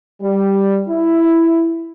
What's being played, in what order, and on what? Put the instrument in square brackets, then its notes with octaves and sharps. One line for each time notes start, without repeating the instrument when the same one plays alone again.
[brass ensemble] G3
E4